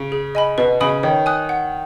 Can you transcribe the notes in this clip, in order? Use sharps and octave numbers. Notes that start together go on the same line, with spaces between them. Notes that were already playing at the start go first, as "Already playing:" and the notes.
Already playing: C#3
G#4
D#5 G#5 B5
B2 B4
C#3 D#5 G#5 B5 D#6
D#3 C#5
G#5 D#6 F#6
F#5